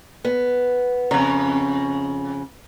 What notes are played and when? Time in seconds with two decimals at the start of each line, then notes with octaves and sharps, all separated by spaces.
0.25 B3
1.11 F2 C#3 A#5